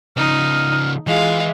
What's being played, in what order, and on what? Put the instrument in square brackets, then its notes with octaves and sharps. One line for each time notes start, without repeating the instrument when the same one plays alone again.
[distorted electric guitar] C#3 F3 [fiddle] D#4 [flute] F6
[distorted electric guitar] E3 [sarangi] G#3 [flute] F4 [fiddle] F5